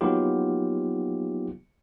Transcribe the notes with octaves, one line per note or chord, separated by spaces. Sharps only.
F#3 A#3 B3 D#4 F4 G4